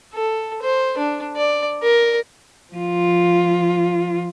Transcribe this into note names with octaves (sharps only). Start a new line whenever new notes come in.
A4
C5
D4
D5
A#4
F3 F4